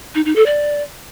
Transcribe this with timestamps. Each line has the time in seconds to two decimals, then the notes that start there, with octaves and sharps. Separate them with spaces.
0.15 D#4
0.25 D#4
0.36 A4
0.46 D5